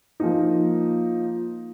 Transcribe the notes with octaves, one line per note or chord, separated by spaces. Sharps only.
F3 A#3 D#4